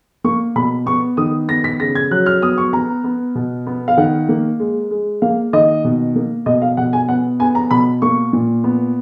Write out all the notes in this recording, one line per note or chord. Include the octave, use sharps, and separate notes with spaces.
A#3 C#6
B2 B5
B3 C#6
D#3 D#6
B3 A#6
B6
C#3 A#6
G#6
F#3 F#6
F6
B3 D#6
C#6
B3 A#5
B3
B2
B3
F5
D#3 F#5
A#3
G#3
G#3
A#3 F5
D#3 D#5
B2
A#3
B2 D#5
F5
B2 F#5
G#5
B3 F#5
B3 G#5
A#5
B2 B5
A#3 C#6
A#2
B3